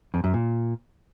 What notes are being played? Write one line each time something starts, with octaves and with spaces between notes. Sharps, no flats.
F2
F#2
A#2